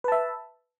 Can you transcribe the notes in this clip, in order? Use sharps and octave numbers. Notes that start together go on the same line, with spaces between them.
B4 E5 A5